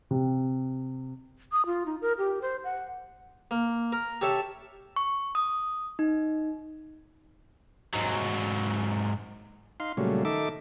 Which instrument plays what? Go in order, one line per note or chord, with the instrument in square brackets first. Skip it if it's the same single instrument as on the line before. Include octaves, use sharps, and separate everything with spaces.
[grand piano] C3
[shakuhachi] D#6
F4
D#4
A#4
G4
C5
F#5
[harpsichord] A#3
A#4
G4 A4 C#5 E5 A5
[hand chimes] C#6
D#6
D#4
[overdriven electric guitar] G#2 F#3
[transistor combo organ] D#4 F5 C6
A#2 C#3 F#3 G3 A3
D#3 D#4 A4 E5 D6